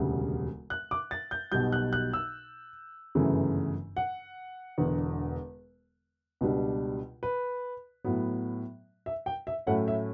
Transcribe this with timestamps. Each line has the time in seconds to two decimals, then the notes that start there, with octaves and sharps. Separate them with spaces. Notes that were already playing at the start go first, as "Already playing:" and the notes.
Already playing: E1 D2 C#3 G3
0.70 F#6
0.91 D6
1.11 A6
1.31 G6
1.52 B1 B2 G3 G6
1.73 F#6
1.93 F#6
2.13 E6
3.15 G1 F#2 C#3 E3 A3
3.97 F#5
4.78 E1 E2 D3
6.41 C#2 B2 G3 D4
7.23 B4
8.04 A2 F#3 B3
9.06 E5
9.26 G5
9.47 E5
9.67 A2 F#3 A3 C#4 E4 F#5
9.88 E5